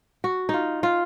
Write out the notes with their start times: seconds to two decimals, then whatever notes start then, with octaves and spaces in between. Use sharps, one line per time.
0.24 F#4
0.49 D#4 F4
0.83 F4